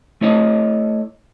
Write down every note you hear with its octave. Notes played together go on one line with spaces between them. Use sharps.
A3 E4 C#5 D#5